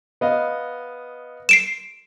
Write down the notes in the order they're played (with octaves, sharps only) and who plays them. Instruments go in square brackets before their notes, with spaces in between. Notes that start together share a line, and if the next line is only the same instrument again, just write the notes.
[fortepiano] B3 D#5 F5
[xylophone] C7 D7 E7